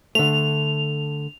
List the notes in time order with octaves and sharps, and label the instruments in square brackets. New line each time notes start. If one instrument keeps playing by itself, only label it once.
[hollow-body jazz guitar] D3 A3 [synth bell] F7